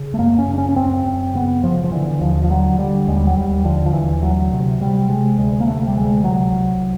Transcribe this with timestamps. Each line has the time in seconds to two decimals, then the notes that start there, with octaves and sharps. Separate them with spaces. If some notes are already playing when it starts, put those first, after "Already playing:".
Already playing: C#3
0.14 A3
0.19 F#2 A#3
0.39 C#4
0.49 C#3 D4
0.58 C#4
0.69 C#4
0.76 F#2 C4
1.05 F#2
1.35 C#3 B3
1.63 C#3 F3
1.84 F3
1.92 D3 E3
2.21 D#2 F3
2.44 F3
2.50 D3 F#3
2.78 D3 G3
3.08 D#2 G#3
3.17 G3
3.27 F#3
3.37 D#2 G3
3.65 D3 F3
3.86 F3
3.93 D#2 E3
4.22 D2 F#3
4.52 C3
4.81 C3 G3
5.09 C3 G#3
5.39 D2 G#3
5.60 A#3
5.67 C3 A3
5.87 G3
5.96 D2 G#3
6.24 C3 F#3
6.53 C2